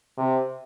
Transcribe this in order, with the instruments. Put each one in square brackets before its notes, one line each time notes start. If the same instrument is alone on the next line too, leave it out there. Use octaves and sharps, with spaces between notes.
[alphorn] C3